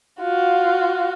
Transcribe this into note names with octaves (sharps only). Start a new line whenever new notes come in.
F4 F#4